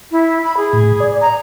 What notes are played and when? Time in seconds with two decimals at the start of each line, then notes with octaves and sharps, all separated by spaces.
0.11 E4
0.44 B5
0.57 G#4
0.73 A2
1.00 D5
1.21 A#5